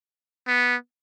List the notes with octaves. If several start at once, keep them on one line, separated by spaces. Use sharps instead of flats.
B3